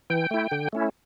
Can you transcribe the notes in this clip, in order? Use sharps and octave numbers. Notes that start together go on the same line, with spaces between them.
E3 G5
A3 E4
D3
A3 C#4 E4